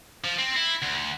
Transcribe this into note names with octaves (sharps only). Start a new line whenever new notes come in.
F3
C4
E4
D2